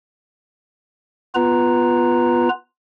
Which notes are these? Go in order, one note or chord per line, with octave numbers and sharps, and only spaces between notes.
B3 F4 B4 A#5